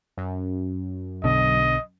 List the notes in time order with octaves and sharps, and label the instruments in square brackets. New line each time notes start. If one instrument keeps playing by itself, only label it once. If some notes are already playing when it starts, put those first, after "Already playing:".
[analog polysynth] F#2
[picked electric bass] B1 B2 D3 [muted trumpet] D#5